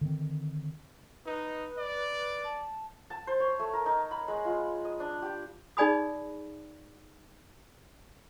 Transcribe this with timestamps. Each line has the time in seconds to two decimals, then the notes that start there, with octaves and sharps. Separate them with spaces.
0.01 D3 D#3 C4
1.26 D#4 B4
1.78 D5
2.44 A5
3.10 A5
3.27 C5
3.40 C#5
3.59 A3
3.73 A#4
3.86 D#4
4.11 B5
4.28 G#3
4.45 F4
4.85 D#5
5.00 D4
5.22 G4
5.77 D#4 G#4 D5 G#5 B5 D#6